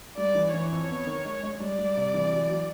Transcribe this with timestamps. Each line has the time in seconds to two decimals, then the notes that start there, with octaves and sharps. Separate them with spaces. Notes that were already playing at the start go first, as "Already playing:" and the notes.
0.17 G3 D5
0.35 E3
0.54 E3 C#5
0.71 F2
0.89 B3
1.06 D#3
1.25 G#3
1.43 G#3
1.60 G3 D5
1.79 G3
1.97 C3
2.14 E3
2.32 F#3
2.50 F#3